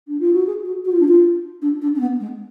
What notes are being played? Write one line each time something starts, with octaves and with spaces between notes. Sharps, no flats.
D4
F4
F#4
G#4
F#4
F#4
F4
D4
F4
D4
D4
C#4
B3
G#3